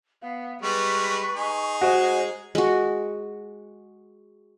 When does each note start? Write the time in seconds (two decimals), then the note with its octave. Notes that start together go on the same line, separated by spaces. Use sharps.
0.22 B3 F5
0.62 G3 G#3 B4 C#6
1.36 D#4 G#4
1.81 G#3 F#4 C5
2.55 G#3 F#4